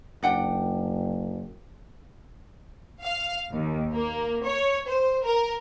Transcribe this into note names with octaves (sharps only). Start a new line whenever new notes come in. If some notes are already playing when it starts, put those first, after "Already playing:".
F#1 D4 F#5 G5
F5
D#2
A#3
C#5
C5
A#4